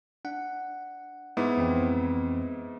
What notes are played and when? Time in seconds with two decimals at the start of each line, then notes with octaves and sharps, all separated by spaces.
0.25 D4 F#5
1.37 G#2 B3 E4
1.57 F2 E3 C4